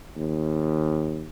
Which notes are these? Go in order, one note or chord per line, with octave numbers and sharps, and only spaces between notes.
D#2